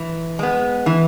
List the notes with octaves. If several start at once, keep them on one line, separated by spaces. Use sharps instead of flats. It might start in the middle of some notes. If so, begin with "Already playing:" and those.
Already playing: E3
G#3 B3
E3